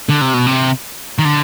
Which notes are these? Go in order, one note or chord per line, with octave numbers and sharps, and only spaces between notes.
D3
C3
B2
C3
D#3
D3